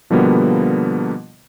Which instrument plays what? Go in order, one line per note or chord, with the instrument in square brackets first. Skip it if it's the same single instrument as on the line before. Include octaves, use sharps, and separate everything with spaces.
[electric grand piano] B2 D3 F3 G3 A#3 B3